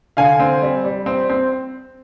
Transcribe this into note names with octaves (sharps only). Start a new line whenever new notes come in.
D3 F5 G#5
C4
G3
G3
C4
C4